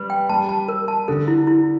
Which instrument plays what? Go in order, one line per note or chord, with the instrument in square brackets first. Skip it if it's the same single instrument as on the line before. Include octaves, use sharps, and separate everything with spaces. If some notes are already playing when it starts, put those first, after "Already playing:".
Already playing: [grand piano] G3 [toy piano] B4
[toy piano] G5
[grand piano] G3 [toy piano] A5
[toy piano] A5
A#4
A5
[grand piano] D3 [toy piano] A4
[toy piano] E4
E4